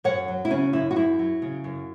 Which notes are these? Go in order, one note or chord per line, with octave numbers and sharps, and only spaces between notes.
F#2 C#5 F#5
F#3
E4
C#3 C#4
F#2 E4
F#4
F#2 E4
F#3
C#3
F#2